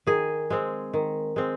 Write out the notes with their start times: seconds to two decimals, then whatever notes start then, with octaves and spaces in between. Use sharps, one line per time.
0.07 D#3 G#4
0.50 G#3 C4
0.94 D#3
1.36 G#3 C4